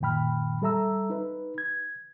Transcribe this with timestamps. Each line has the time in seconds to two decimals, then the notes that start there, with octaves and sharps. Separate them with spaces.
0.01 F#2 A#2 D#3 G5 B5 F6
0.62 G3 A4 E5 A#5 E6
1.10 D#4 B4
1.58 G#6